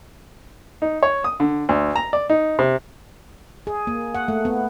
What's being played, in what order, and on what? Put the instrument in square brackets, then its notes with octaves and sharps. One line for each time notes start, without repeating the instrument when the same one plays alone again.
[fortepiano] D#4
C#5
D#6
D3
D2
A#5
D5
D#4
C3
[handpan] G#4
A#3
F#5
A3
B3